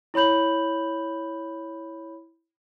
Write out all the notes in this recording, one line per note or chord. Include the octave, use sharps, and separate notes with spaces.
E4 C#5 B5 G6 F#7